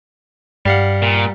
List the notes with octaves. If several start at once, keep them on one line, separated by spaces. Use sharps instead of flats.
G2 G3 F5 F#5
A#2